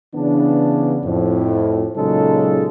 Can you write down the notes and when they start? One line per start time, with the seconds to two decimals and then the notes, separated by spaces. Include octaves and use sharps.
0.15 C#3 E3 B3 D4
1.04 F2 A2
1.96 A#2 C#3 F#3 G#3 D#4 A4